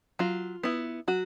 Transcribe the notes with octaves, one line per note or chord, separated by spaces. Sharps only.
F#3 F4
B3 E4
F#3 F#4